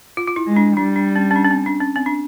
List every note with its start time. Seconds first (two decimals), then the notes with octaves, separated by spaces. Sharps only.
0.17 F4
0.28 F4
0.36 E4
0.47 G#3
0.56 D4
0.76 G3 D4
0.96 D4
1.16 C#4
1.31 C#4
1.36 D4
1.45 C#4
1.51 C4
1.66 D4
1.80 C#4
1.96 C4
2.06 D4